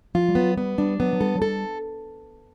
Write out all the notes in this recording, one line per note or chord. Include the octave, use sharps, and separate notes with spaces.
F3 F4
G3
F#3 B3
G3 B3
G3 D4
F#3 B3
F#3
G3 A4
F#3
G3 A4